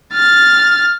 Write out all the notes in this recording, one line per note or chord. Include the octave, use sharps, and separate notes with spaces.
F6 A6